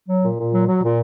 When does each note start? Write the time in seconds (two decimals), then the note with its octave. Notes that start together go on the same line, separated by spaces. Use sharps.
0.09 F#3
0.23 A#2
0.38 A#2
0.52 F#3
0.67 F#3
0.82 A#2